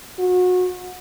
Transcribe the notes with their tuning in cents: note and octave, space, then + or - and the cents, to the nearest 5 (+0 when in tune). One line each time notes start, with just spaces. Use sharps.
F#4 -30